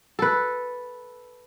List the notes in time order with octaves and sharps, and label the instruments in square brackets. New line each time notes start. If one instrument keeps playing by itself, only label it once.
[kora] A4 B4